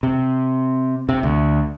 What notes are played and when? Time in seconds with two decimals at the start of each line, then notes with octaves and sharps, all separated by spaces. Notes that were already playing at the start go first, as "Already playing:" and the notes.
0.03 C3
1.09 C3
1.23 D2